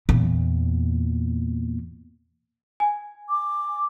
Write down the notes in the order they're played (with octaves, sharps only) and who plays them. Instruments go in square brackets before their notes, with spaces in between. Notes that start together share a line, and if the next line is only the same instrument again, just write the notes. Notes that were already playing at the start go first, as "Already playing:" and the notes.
[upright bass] E2 A#2
[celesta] G#5
[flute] D6